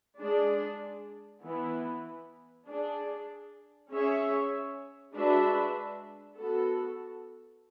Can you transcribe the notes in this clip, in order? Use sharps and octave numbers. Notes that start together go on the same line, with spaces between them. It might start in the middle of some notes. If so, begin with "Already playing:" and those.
G#3 D4 G#4 D5
E3 B3 E4
D4 G#4 D5
C#4 G#4 C#5 E5
G#3 D4 F#4 B4 E5
B3 F#4 A4